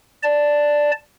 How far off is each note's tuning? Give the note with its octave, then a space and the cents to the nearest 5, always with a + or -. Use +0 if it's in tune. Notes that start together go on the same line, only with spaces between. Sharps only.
D5 +0 A5 +0